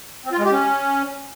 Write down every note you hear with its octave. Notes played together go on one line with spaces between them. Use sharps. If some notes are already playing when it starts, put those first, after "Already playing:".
C4
F4
G#3
G4
C#4